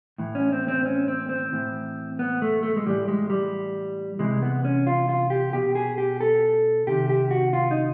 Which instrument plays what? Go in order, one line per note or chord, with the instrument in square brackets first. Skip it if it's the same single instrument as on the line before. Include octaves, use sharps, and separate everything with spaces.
[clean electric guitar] A2 E3
C#4
C4
C4
C#4
C4
C4
A2 E3
B3
A3
A3
G#3
A2 E3 G3
G#3
G3
C3 E3 G#3
B3
C#4
F4
F4
G4
B2 G4
G#4
G4
A4
C3 D#3 G4
G4
F#4
F4
D#4